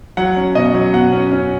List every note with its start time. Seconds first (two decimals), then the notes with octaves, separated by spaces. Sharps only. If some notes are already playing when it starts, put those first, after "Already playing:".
0.17 F#3 F#5
0.37 C#4
0.55 B2 D#5
0.74 F#3
0.93 B2 F#5
1.13 C#4
1.32 C#4